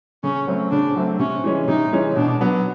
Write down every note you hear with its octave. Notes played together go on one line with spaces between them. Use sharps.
C#3 C#4
F#3 A3 C4
C#3 D4
F#3 A3 C4
C3 C#4
E3 G#3 C#4
C3 D#4
E3 G#3 C#4
B2 D4
F#3 B3